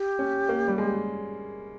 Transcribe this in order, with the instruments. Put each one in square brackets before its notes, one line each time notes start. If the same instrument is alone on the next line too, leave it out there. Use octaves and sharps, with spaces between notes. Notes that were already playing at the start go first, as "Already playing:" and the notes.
Already playing: [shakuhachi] G4
[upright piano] C#4
A#3
G3
G#3